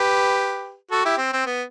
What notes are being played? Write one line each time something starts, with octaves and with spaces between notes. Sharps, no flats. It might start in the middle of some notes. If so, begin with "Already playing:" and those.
Already playing: G4 B4
F#4 A4
E4 G4
C4
C4
B3